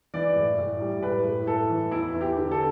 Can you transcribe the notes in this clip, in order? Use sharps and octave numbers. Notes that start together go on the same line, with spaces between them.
E3 D5
A2
A2
G3
A2 B4
A2
A2 A4
E3
E2 E4
E2
G4
D3
A4